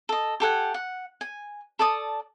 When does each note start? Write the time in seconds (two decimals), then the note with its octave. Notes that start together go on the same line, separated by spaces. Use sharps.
0.09 A4 D#5
0.40 G4 A4 F#5 G#5
0.74 F#5
1.21 G#5
1.79 A4 D5 A5 D#6